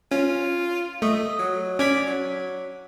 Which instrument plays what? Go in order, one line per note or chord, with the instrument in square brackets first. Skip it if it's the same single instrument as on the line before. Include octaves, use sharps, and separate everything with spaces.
[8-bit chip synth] C#4 [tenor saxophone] F4
[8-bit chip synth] A3 [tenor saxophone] D#5
[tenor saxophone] F#3
[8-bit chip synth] C#4 G#6 B6 [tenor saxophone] D5
[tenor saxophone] F#3